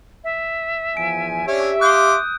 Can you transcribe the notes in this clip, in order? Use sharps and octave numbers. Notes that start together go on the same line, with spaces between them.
E5
E2 F3 G#5 D7
C#4 D4 G4 C#5 E5
F5 C6 D6 D#6 F#6 G6